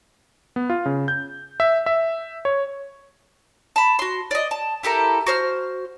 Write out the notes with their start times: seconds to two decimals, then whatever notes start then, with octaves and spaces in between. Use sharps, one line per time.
0.56 B3
0.70 F4
0.86 C#3
1.08 G6
1.60 E5
1.86 E5
2.45 C#5
3.76 A5 B5
3.99 F#4 C6
4.31 D5 D#5
4.51 A5
4.83 E4 G4 A4 A#4
5.27 F#4 C5 F6